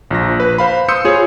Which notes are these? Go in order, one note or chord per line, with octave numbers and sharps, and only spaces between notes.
A#1 F3 A#6
B4
C5 F5 B5
C6 D#6 E6 G6 C#7
F4 G#4 C#5